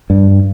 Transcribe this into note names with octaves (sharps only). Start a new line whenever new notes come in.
G2